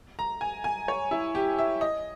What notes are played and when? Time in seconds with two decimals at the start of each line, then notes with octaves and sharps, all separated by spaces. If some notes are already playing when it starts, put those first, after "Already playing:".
0.19 A#5
0.41 G#5
0.64 G#5
0.88 C#5
1.11 E4
1.35 G4
1.58 E5
1.81 D#5